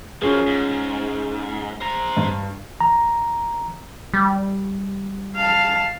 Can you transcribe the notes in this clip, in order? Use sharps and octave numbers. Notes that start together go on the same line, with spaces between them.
F#2 F3 C#4 F4 G#4
G#2
C5 A#5
G2
A#5
G3
F5 A5